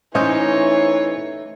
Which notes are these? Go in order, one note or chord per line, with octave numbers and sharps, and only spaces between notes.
E3 A3 C#4 D#4 C5 C#5 D#5